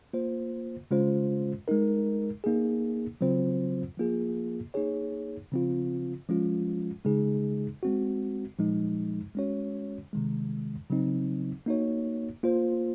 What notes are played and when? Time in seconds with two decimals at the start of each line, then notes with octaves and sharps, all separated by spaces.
0.13 A#3 F4 C5
0.91 C#3 G#3 C#4 F4 C5
1.68 G#3 D#4 A#4
2.44 A#3 D#4 G#4
3.21 C#3 F#3 C4 F4 C5
3.97 F3 A#3 F4 G#4
4.74 A#3 D#4 G#4 C#5
5.52 C#3 F3 C4 F4
6.29 F3 G#3 C#4 F4
7.05 C#3 G#3 D#4 G#4
7.83 G#3 C4 F#4
8.59 A#2 F3 G#3 D#4
9.35 G#3 C#4 F#4 C#5
10.13 C3 D#3 G#3
10.90 C#3 F#3 C4 D#4
11.66 A#3 D#4 F#4 C#5
12.43 A#3 F4 C5